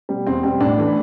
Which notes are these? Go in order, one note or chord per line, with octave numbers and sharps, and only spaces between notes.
B2 G3
E2 C4
B2 G3 C4
A2 D4
E3 A3